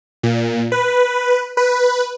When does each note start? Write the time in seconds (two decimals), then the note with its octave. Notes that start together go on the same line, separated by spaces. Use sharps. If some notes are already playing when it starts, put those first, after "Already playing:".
0.23 A#2
0.72 B4
1.57 B4